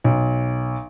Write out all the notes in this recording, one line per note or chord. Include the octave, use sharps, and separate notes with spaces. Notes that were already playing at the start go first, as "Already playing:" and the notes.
B1